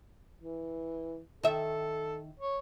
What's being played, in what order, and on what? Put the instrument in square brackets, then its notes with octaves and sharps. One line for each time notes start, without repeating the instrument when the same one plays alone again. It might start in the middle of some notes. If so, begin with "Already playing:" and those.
[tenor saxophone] E3
[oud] D#3 E5 [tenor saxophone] A4
[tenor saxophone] C#5